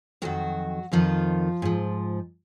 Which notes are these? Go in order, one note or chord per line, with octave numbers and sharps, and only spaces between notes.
F2 D#3 F#3 F#4
F2 D#3 F3 F4
G#2 F3